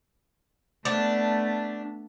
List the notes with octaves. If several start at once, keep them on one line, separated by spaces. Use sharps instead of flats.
A3 B3 D4